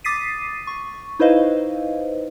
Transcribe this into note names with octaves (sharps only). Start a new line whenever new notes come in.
D6 D#6 A6 B6 C7 D#7
C#6
D#4 E4 B4 C5 D#5 F5